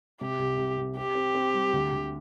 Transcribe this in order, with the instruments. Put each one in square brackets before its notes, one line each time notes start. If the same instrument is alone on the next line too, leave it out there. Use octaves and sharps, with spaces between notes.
[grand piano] C3 [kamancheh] G4
[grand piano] C2
C2
C3
[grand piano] C4 [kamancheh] G4
[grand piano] C4
C4
G3
D2
D2